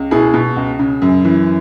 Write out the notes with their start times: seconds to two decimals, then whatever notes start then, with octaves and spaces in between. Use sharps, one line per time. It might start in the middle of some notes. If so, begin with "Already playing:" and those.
Already playing: C#2
0.11 B2 E4 G#4
0.34 B2
0.56 C#2
0.79 C#3
1.02 F#2
1.25 E3